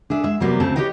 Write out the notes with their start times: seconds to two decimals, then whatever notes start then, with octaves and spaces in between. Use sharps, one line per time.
0.10 D4 G#4 E5
0.24 G#3 E5
0.40 C3 E3 F#3 G3 A#3 B3
0.60 D2 C#3 A3 C4 A5
0.76 G4 G#4 B4 C#5 D#5 G5